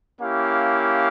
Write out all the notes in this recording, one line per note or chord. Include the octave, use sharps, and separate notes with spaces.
A#3 C#4 E4 G4 F5